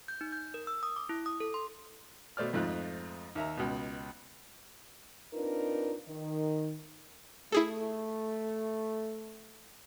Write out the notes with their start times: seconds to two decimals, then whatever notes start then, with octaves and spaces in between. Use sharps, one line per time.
0.08 G6
0.21 D#4
0.32 G6
0.54 A#4
0.67 E6
0.83 D#6
0.96 D6
1.09 E4
1.26 D#6
1.40 A4
1.54 C6
2.37 B2 A3 C5 D5 F6
2.53 F2 G#2 A3 F4 F#6
3.35 D#2 E5 A#5
3.57 C#2 B2
5.34 C4 D4 D#4 F4 A#4 B4
6.08 D#3
7.52 A3 E4 G#4 A4